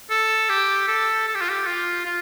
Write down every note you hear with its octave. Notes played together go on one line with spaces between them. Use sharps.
A4
G4
A4
A4
G4
F4
G4
F4
F4